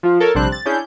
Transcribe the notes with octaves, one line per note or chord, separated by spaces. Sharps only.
F3 F4
A4 A#4 C#5
A#1 C3 G3 C4 D4 F#6
A6
C#4 D4 E4 G#4 G6